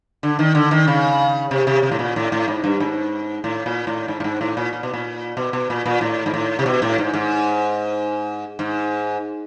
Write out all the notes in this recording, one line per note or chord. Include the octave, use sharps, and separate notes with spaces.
D3
D#3
D3
D#3
C#3
C3
C3
C3
A2
A#2
A2
A2
G#2
G2
G#2
A2
A#2
A2
G#2
A2
G#2
A2
A#2
A#2
B2
A#2
B2
B2
A#2
A#2
A2
G#2
A2
C3
B2
A2
G#2
G#2
G#2